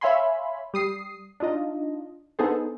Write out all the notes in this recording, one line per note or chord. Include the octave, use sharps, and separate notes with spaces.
C#5 E5 F5 G#5 B5 C6
G3 D#6 C7
D4 D#4 F4 D#5
B3 D4 D#4 G#4 A4 C5